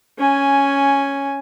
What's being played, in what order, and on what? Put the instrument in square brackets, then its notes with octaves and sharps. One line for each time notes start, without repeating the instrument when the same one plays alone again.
[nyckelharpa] C#4 G#5